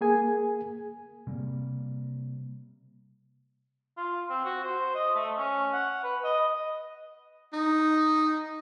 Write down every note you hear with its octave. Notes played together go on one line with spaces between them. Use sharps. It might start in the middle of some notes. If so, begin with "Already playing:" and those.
A#3 G#4 G#5
C3 G3 A#3
F4
C4
F#4
C5
D#5
A3
C#4
F#5
B4
D#5
D#4